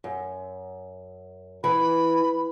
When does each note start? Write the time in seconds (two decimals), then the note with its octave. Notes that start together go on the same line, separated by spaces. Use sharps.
0.04 F#2
1.64 E3 B5